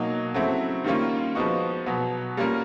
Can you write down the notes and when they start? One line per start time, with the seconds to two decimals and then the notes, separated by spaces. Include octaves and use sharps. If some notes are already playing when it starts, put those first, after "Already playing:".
Already playing: B2 F#3 A#3 D#4
0.34 C#3 F#3 A3 C4 E4
0.84 D#3 G3 A#3 C#4 F4
1.35 F3 G#3 B3 D#4 F#4
1.86 B2 F#3 B3
2.37 G3 A#3 C#4 F4 A#4